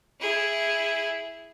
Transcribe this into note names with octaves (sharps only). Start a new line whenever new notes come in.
E4 G#4